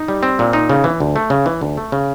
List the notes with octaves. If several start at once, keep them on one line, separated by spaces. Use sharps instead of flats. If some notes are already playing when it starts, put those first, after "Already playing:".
Already playing: D#4
G3
C4
A#2
D#4
C#3
E3
D2
A3
C#3
E3
D2
A3
C#3